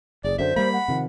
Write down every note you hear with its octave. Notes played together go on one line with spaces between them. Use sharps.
F#1 G#4 D5
F#2 D3 C5 E5
G3 A#3 B5
F#5
C3 D#3 F3